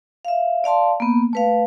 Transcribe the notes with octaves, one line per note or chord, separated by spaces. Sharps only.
E5 F5
D5 F5 A5 C6
A#3 B3
A3 B4 F5